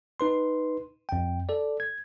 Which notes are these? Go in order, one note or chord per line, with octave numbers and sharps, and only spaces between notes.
D#4 B4 C6
F2 G5
A4 D5
G#6